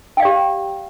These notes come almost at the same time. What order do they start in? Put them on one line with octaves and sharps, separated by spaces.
G5 F5 D5 G4